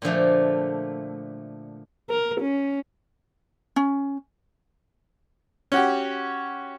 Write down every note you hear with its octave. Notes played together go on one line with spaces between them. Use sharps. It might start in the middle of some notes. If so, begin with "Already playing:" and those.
A#2 D3 F3 A3
A#4
C#4
C#4
C#4 F#4 G4